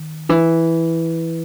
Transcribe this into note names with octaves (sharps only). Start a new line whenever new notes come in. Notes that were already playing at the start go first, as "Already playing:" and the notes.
Already playing: D#3
E3